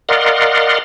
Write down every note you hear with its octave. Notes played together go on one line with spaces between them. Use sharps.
A#4 D5 D#5 F5 F#5 C6